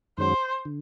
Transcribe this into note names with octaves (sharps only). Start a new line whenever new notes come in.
F#2 D#3 G#3 C#4 F#4 C5
D3